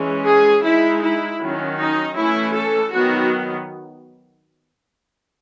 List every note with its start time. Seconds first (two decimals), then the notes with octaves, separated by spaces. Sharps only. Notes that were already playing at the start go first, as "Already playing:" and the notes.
Already playing: E3 G#3 C#4
0.25 G#4
0.62 G#3 D#4 E4
1.01 E4
1.39 D#3 F#3 C#4
1.77 D#4
2.16 E3 A3 C#4 E4
2.53 A4
2.91 D#3 F#3 B3 F#4